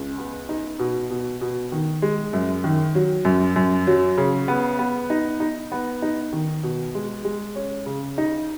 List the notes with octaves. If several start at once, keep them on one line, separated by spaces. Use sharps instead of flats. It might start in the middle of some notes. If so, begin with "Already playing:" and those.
Already playing: C#2
B3
D#4
B2
B2
B2
D#3
G#3
F#2
D#3
F#3
F#2
F#2
F#3
C#3
B3
B3
D#4
D#4
B3
D#4
D#3
B2
G#3
G#3
C#4
C#3
D#4